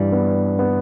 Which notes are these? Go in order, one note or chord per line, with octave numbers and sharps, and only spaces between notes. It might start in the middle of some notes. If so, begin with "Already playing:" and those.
Already playing: G2 E3 G3
B3
B3